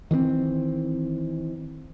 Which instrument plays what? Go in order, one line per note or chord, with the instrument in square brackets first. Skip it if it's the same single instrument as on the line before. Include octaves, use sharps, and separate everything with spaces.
[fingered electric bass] D#3 E3 A#3 C4